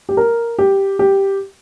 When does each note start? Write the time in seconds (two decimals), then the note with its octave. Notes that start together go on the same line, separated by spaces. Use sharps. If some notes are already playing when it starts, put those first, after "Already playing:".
0.09 G4
0.17 A#4
0.59 G4
0.99 G4